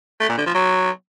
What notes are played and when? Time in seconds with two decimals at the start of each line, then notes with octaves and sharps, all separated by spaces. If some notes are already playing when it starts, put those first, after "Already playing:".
0.20 A3
0.29 A#2
0.37 D3
0.46 F3
0.55 F#3